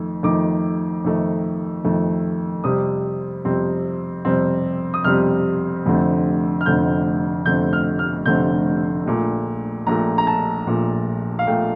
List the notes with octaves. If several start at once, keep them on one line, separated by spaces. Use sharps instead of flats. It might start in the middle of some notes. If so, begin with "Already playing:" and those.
Already playing: F2 D#3 A3
F2 D#3 A3 D6
F2 D#3 A3
F2 D#3 A3
F2 C3 G3 C4 D#6
F2 C3 G3 C4
F2 C3 G3 C4
D#6
F2 C3 G3 C4 F6
F1 F2 D3 A3 C4
F6
F1 F2 D3 A3 C4 G6
F1 F2 D3 A3 C4 G6
F6
F6
F1 F2 D3 A3 C4 G6
A#1 A#2 A3
A#1 A#2 A3 A#5
A#5
A5
A#1 A#2 A3
F5
A#2 A3 G5